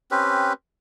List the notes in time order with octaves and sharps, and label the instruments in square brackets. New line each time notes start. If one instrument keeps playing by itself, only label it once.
[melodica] C4 C#4 G4 B4